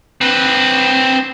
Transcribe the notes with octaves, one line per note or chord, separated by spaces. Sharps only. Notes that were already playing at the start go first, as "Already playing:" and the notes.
C4 B4